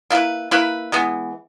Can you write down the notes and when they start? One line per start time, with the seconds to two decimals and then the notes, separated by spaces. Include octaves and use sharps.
0.10 A#3 E4 B4
0.51 A#3 E4 B4
0.92 E3 G#3 B3